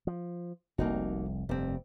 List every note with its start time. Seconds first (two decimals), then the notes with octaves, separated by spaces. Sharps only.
0.07 F3
0.78 F1 C2 A#3 D#4 F#4
1.49 F1 G2 G3 C4